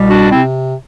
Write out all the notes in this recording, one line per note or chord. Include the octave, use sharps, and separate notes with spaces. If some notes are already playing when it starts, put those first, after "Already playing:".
Already playing: C2 B2 G3
D4 F#4
C3 C4 E4